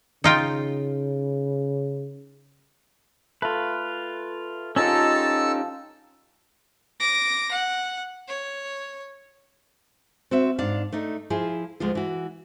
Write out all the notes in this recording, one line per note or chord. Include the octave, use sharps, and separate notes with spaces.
C#3 D#4 F4 G5
A3 F4 B4
F3 G#3 C#4 D#4 G4 A4 A5 E6
D6 A#6
F#5
C#5
C4 F#4 E5
G#2 D4 D5 F5
A3 D4 D#4
F3 E4 F4 G#4
D2 F3 G#3 F4
E3 F#4